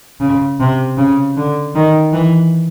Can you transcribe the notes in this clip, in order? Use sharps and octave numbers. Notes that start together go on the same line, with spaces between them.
C#3
C3
C#3
D3
D#3
E3